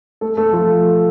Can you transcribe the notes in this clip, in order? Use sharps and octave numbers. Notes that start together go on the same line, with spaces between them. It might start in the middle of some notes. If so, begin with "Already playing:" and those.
A3 A4
A3 A4
F3 F4